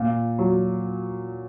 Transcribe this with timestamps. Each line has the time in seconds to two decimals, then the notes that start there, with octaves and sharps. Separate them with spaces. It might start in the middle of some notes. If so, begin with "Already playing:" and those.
Already playing: A#2
0.39 F#3